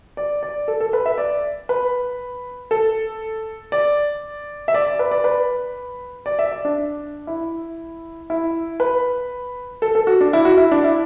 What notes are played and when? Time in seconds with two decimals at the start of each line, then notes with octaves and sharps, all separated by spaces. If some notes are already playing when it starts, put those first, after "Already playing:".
0.17 D5
0.43 D5
0.68 A4
0.80 A4
0.93 B4
1.06 E5
1.18 D5
1.69 B4
2.71 A4
3.72 D5
4.68 E5
4.74 D5
4.87 D5
4.99 B4
5.11 D5
5.24 B4
6.26 D5
6.39 E5
6.51 D5
6.65 D4
7.27 E4
8.30 E4
8.80 B4
9.82 A4
9.95 A4
10.07 F#4
10.21 D4
10.33 E4
10.45 F#4
10.58 E4
10.71 D4
10.84 E4